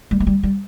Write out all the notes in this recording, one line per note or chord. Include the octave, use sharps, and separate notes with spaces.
G3
G#3
G3
G3